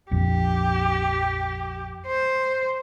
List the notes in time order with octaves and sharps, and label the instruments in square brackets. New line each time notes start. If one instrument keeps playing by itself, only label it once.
[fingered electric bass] A#1 F2 [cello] G4
[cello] C5